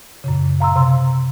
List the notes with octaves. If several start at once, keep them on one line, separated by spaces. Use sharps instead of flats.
F#2 A#2 C#3
F5 A#5 C6 E6
C3 C6